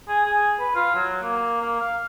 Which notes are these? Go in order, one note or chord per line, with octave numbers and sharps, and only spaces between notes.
G#4
G#4
B4
F4
F#3
A#3
A#3
F5